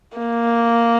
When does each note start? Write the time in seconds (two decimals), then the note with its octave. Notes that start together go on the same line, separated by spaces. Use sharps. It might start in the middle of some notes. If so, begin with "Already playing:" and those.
0.17 A#3